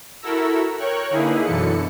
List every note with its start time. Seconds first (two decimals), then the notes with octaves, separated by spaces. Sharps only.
0.22 E4 F#4 A4 A#4 A#5 E6
0.77 A#4 C#5 G5 C#6 F#6
1.10 D3 A#3 D#4 E4 G#4 B4
1.44 F#2 B2 D3 E3 A4 C#7